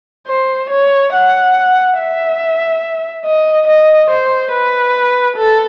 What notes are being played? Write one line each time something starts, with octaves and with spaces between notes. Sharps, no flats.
C5
C#5
F#5
E5
D#5
D#5
C5
B4
A4